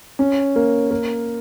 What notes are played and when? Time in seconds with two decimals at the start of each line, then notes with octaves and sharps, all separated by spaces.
0.19 C#4
0.56 A#3
0.91 A#3